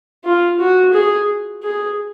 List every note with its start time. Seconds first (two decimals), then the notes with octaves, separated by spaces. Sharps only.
0.24 F4
0.59 F#4
0.93 G#4
1.63 G#4